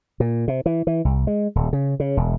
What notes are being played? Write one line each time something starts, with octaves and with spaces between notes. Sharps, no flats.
A#2
C3
E3
E3
C2
G#3
D#1
C#3
C#3
E1